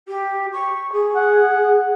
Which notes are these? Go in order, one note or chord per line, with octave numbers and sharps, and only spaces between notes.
G4
C#6
G#4
F#5